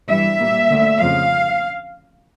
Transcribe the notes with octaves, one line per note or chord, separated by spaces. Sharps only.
G2 E3 G3 E5
A#2 G3 A#3
D2 D3 A3
F2 C#3 F3 F5